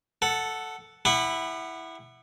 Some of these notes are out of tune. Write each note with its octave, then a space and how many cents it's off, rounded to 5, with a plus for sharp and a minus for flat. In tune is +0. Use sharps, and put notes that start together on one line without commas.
A4 +0 F#5 +0
E4 +0 G4 +45 F#5 +0